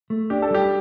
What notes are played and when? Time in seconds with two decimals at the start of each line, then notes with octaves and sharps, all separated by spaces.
0.10 A3
0.30 D4 G4
0.42 A4
0.51 G3 G4